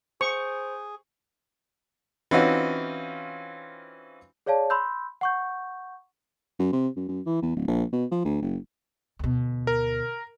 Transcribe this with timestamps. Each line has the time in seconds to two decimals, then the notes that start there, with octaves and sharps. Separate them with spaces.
0.21 G#4 C5 C#6
2.31 E3 C4 C#4 D#4 F4 F#4
4.46 G#4 C#5 D5 F5 A5
4.70 B5 C6 E6 G6
5.21 F#5 C#6 G6
6.59 F#2
6.73 C3
6.96 F#2
7.09 F#2
7.26 E3
7.42 E2
7.56 D1
7.68 A#1
7.93 B2
8.12 F3
8.25 D2
8.42 F#1
9.19 D2 B2
9.67 A#4